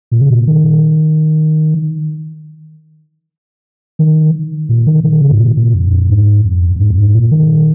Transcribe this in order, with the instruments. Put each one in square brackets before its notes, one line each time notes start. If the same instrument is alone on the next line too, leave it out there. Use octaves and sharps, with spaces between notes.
[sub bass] A#2
C#3
A#2
D#3
D#3
A#2
D#3
D#3
C#3
G#2
A#2
A#2
F2
F2
G#2
F2
F2
G#2
F2
G#2
A#2
D#3